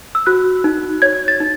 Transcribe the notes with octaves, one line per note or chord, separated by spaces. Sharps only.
E6
F#4 F#6
D#4
C#5 G#6
A6
D#4